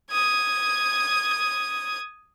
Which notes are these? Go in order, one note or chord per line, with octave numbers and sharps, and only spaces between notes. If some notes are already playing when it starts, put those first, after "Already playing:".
D#6 G#6